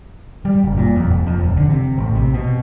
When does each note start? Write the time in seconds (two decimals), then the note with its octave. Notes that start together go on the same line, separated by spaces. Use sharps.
0.45 G3
0.64 F#1
0.78 A#2
0.96 F2
1.10 F1
1.26 F2
1.40 D#1
1.57 D3
1.69 C3
1.98 A1
2.15 C3
2.34 B2